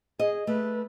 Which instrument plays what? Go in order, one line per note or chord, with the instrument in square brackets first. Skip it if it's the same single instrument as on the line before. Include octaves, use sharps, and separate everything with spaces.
[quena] G#4 [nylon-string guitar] D#5
[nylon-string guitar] A3 [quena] B4